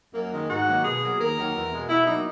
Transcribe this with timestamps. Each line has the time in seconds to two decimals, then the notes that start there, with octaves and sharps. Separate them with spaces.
0.15 F#2 A#3
0.33 D#3 G#3
0.49 G#2 F#4
0.67 D#3 F#3 A#3
0.84 B2 G#4
1.02 F#3 A#3
1.19 D#2 A#4
1.37 D#3 F#3 A#3
1.54 E2
1.72 B2 G#3
1.88 B2 E4
2.06 F#3 A#3 D#4